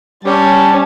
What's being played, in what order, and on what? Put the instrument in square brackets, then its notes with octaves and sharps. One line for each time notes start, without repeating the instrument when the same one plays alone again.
[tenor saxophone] G3 [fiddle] C#4 [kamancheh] G#5 A5